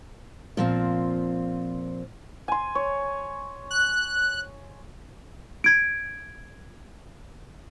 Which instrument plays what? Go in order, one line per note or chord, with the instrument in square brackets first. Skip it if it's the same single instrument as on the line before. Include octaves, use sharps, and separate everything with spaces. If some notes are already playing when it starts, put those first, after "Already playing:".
[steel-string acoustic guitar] A#2 F3 C4
[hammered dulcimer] G#5 C6
C#5
[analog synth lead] F#6
[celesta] G#6 D7